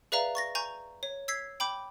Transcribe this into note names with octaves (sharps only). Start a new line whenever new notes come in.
G#4 B4 D5 E5 F5 A#5
C#6 A6 A#6
G#5 A#5 C#6 G6
C#5
E6 G#6 B6 C7
G5 B5 D6 G6